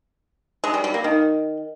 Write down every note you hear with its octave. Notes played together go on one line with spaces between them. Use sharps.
G#3
G3
G3
A#3
D#3